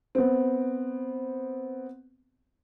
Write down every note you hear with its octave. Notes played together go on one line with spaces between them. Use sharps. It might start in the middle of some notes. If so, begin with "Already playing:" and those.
B3 C4